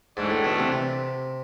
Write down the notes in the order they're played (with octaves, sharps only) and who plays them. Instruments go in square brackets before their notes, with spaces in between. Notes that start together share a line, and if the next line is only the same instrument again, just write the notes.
[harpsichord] G#2 [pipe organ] E3 A3 D4
[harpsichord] A2
B2
C3
C3